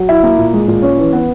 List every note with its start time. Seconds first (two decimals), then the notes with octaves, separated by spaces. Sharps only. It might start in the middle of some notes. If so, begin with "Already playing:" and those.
Already playing: F#3
0.09 E4
0.23 A#3
0.38 A#2
0.53 G#3
0.68 A#2
0.82 C#4
0.98 E3
1.13 B3